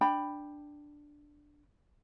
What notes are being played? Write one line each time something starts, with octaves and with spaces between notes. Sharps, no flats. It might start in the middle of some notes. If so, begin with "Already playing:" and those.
D4 G5 B5